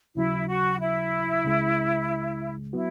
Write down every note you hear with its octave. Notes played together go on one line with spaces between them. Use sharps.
D#2 C#3 F#3 E4
F#4
E4
C#2 C#3 G#3
F#3 B3 E4 F#4